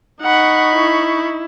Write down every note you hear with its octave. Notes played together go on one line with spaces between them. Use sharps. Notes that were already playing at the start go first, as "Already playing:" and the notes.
D#4 F#5 B5 C#6
E4